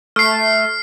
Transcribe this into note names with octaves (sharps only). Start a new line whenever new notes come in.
A3 F6 C7